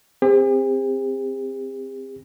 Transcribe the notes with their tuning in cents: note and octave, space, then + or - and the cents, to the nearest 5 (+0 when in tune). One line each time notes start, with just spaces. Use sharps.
C4 +0 G4 +45